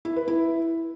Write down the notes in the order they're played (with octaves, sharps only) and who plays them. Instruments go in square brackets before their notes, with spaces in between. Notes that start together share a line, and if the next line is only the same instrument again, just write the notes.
[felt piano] E4
B4
E4